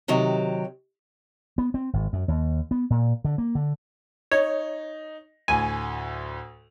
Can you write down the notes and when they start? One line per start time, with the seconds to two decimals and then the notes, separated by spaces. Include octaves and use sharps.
0.08 C3 D#3 F#3 G4
1.58 B3
1.74 C4
1.93 G#1
2.13 F#2
2.28 D#2
2.71 B3
2.90 A#2
3.25 D3
3.38 A#3
3.55 D3
4.32 D#4 C#5
5.48 D2 A2 G#5